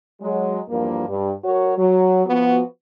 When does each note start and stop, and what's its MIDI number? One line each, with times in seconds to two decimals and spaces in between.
0.22 0.59 54
0.22 0.59 56
0.69 1.05 40
0.69 1.05 43
0.69 1.05 53
0.69 1.05 58
1.08 1.31 43
1.44 1.73 54
1.44 1.73 66
1.44 1.73 70
1.44 1.73 73
1.77 2.23 54
2.26 2.61 53
2.26 2.61 59
2.26 2.61 66